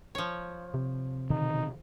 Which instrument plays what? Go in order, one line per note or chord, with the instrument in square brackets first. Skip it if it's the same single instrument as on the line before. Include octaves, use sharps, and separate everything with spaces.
[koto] F3 C#5
[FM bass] C3
[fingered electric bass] B2 D3 D#3 [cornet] D#4